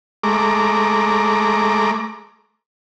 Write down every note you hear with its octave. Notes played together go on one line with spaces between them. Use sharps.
G#3 A3 A#5 D6